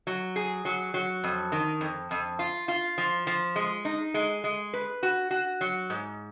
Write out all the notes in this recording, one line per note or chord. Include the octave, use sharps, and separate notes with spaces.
F#3
G#4
F#3
F#3
F2
D#3
F2
F2
F4
F4
F3
F3
G#3
D#4
G#3
G#3
B4
F#4
F#4
F#3
G#2